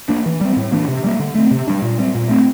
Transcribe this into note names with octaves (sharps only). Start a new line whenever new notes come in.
A#3 D4
E3
G3 C4
A2
E3 A#3 D4
C3
G3 A#3
D3
A3 C4
C3
G3 D4
A#2
G3 C4
A#2
A3 C4